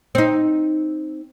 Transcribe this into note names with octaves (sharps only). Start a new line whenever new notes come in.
C4 D#4